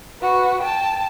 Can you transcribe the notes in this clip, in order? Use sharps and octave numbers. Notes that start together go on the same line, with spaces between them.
F#4 B4
G5 A5